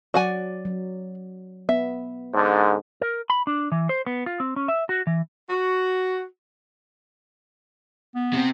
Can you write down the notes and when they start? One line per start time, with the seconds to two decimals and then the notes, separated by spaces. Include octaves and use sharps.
0.14 F#3 F#4 D5 F#5 G#5
0.65 F#3
1.69 B3 E5
2.34 G#2 D3
3.01 A#4
3.30 B5
3.47 D4
3.72 E3
3.89 C5
4.07 B3
4.26 F4
4.40 C4
4.56 C#4
4.68 E5
4.89 F#4
5.07 E3
5.50 F#4
8.15 B3
8.33 C3 C4